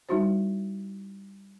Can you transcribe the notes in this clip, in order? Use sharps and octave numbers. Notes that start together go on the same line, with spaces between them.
G3 D#4 E4 F#4 C5